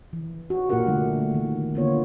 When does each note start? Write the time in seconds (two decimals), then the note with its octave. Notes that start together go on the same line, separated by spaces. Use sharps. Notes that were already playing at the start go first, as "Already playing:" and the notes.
0.13 E3
0.50 F#4
0.69 A#2 A#3 F4 G4 A#4 F#5
0.87 D3 G3 A3
1.34 D#3
1.75 D3 A#3 B3 F4 C#5